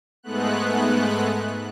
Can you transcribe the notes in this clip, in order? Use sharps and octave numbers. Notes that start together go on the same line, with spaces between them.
G#2 G#3 A3 B3 F#6